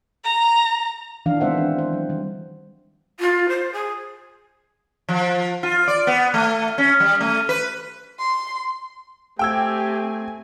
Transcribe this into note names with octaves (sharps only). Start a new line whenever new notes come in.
A#5
D#3 E3 D4 F5
G#3 B3 C4 C5 E5 F#5
D4
C5
F#3
D#3 G3
F4
C5
G#4
F3
F4
D5
B3
A3
C#4
G3
A3
B4
C6
A3 C4 G4 G5 G#5 E6 G#6